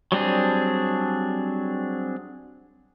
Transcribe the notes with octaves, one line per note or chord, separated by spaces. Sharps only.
F#3 G3 C4 D4 G#4